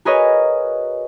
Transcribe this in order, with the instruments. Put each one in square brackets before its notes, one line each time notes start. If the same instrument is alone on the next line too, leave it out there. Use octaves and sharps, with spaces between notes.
[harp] F#4 G#4 A#4 B4 C#5 D#5